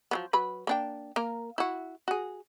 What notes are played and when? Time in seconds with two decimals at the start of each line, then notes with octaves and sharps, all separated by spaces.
0.11 F3 F#3 B3
0.33 F#3 B4 B5
0.67 A#3 D4 G5
1.16 A#3 A#4
1.58 E4 F#4
2.08 F#4 G#4